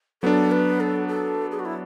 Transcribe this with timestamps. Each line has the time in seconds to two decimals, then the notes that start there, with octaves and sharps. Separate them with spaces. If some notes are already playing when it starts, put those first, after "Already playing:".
0.23 F#3 B3 D4 A4
0.51 B4
0.80 A4
1.08 A4
1.51 G#4
1.59 F#4
1.65 E4